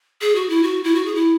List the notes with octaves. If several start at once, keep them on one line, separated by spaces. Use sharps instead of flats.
G#4
F#4
E4
F#4
E4
F#4
G#4
E4